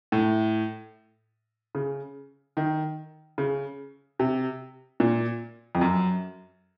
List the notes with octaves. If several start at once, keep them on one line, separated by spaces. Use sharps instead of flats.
A2
C#3
D#3
C#3
C3
A#2
F2
F#2